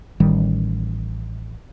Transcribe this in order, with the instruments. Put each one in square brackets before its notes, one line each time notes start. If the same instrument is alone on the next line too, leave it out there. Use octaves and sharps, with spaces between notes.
[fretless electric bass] A1 D#3 G3